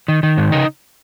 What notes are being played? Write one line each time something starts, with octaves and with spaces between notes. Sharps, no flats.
D#3
D#3
G#2
C#3 D#4